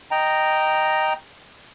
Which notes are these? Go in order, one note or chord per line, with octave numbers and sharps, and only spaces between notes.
D#5 G5 A#5